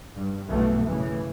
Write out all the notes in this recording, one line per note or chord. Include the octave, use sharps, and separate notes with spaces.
G2
B1 B2 E3 A3
A2 C#3 E3